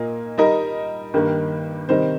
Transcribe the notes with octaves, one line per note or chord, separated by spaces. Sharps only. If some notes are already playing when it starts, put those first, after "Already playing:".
Already playing: A#2 A#3 F4 D#5
G3 D#4 A#4 D#5
G2 D#3 G3 A#3 G4
C3 D#3 G3 D#4 C5